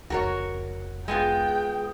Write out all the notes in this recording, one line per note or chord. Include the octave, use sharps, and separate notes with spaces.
F1 C#2 F#4 A#4 C#5
G#3 B3 F4 G#4 G5